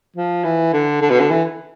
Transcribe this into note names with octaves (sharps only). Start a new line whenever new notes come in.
F3
E3
D3
D3
B2
D3
E3